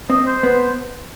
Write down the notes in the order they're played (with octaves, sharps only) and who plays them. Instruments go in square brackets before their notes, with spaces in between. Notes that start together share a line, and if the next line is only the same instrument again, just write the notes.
[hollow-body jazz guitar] C4 [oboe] D#5
[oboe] C5
[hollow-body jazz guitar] B3